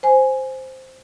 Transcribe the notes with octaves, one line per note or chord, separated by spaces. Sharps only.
C5 G#5